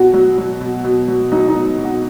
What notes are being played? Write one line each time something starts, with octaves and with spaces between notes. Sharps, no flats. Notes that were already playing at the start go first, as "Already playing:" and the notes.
Already playing: B2 F#4
F#3
F#3
B2
B2
F#3
F#3 D#4
D#4
B2
B2
F#4